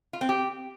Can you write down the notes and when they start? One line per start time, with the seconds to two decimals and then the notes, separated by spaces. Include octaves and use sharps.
0.13 F4
0.21 C4
0.29 G4